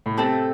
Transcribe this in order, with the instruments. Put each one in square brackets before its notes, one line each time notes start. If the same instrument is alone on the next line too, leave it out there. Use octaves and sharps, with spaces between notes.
[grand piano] A2
[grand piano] C3 [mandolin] A3 C4 A4